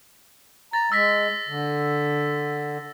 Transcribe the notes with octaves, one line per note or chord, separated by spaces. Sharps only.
A#5 A6
G#3 E6 A#6 B6
D3